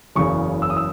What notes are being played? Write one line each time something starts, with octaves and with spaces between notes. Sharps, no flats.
F#1 E2 C#3 F#3 C#6
E6
D#6
E6